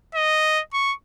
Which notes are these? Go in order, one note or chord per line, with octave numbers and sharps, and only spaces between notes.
D#5
C#6